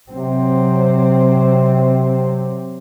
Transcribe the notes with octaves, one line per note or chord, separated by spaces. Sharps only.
C3 F#3 C4